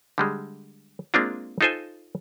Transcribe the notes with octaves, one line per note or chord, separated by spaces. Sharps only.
D3 G3 G#3
G#3 A#3 C4 D4 F4
D#4 F4 A4 C5 G#5